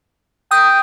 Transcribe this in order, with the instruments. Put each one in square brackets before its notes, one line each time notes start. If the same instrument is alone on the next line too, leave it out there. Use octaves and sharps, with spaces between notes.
[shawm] G5 [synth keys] D#6